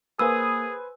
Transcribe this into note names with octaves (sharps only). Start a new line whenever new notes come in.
A#3 G#4 B4 C5 G#5 D#6 E6